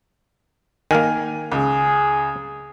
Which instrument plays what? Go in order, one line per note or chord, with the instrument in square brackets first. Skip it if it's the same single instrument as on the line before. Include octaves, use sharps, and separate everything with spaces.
[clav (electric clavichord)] D#3 A#3 [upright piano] G#5 F6
[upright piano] C#2 [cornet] G#4